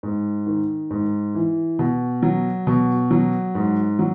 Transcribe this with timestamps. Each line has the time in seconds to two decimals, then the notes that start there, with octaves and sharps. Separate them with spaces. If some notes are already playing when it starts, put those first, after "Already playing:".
0.03 G#2
0.47 D#3
0.91 G#2
1.35 E3
1.79 B2
2.23 F#3
2.67 B2
3.11 F#3
3.55 G#2
3.99 F#3